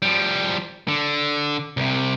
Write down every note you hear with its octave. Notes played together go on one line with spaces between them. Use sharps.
F3 G3
D3
C2 C3